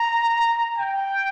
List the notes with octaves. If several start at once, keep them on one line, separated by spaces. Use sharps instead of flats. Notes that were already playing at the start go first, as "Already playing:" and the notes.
Already playing: A#5
G5